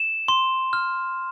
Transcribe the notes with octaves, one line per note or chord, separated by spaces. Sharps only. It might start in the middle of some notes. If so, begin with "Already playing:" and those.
Already playing: E7
C6
F6